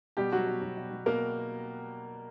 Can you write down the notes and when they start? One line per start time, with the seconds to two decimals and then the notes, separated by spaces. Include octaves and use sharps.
0.17 B2 G3 G4
0.32 F#3 F#4
0.47 B2
0.61 F#3
0.77 B2
0.91 F#3
1.06 B2 A#3 A#4